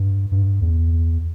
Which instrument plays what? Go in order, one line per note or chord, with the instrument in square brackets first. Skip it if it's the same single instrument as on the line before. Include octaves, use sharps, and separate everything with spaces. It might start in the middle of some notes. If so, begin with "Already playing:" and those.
Already playing: [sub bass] G2
G2
E2